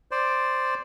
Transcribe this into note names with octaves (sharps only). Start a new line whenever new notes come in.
C5 D5